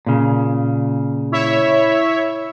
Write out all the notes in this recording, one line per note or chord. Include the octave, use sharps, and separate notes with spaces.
A#2 C#3
E4 C#5 E5